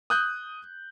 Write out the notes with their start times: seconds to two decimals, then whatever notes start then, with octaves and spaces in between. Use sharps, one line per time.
0.10 D#6 F#6 G6